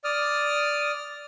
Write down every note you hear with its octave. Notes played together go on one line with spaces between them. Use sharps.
D5 D#6 F6